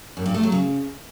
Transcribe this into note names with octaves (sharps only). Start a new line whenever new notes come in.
F#2
G2
A3
F#3
C#3